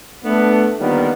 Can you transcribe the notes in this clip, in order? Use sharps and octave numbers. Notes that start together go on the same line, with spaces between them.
A3 B3 D4
D3 D#3 F3 G3 A#3 B3